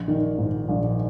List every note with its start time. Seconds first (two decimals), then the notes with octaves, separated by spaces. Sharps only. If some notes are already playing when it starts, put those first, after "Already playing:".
Already playing: A#1
0.08 D#3
0.38 G#2
0.69 A#1